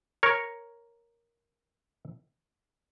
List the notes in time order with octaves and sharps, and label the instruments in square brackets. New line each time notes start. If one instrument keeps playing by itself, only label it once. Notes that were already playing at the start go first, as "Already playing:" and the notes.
[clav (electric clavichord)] A#4 C#5